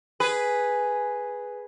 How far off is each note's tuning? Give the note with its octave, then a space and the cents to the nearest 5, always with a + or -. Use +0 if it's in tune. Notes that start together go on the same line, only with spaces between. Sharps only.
G#4 +0 B4 +0